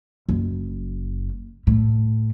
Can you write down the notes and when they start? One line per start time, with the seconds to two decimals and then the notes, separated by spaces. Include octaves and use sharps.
0.29 F#1
1.67 A2